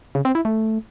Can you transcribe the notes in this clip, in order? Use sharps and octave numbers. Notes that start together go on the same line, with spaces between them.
C#3
C4
E4
A3